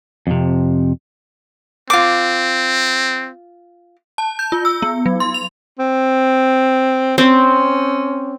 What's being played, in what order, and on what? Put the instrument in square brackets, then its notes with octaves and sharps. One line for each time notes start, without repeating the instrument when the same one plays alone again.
[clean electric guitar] F2 C3
[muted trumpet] C4 [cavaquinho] F4 D6
[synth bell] A5
G6
F4
E6
B3
F#3
C6
F7
[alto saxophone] C4
[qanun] C4 [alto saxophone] C#4